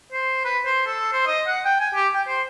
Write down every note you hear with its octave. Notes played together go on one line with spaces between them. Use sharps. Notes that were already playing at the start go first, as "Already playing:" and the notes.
C5
B4
C5
A4
C5
D#5
F#5
G5
G#5
G4
G5
C5